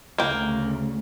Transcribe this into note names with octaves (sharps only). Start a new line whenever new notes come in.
D2 C#3 A#3 G5